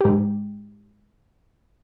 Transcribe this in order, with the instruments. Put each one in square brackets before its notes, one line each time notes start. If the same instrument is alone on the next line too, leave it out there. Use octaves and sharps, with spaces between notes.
[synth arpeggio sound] G#2 G4